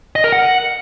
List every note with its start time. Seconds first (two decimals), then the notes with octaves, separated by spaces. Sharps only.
0.16 D#5
0.24 A#4
0.32 F#5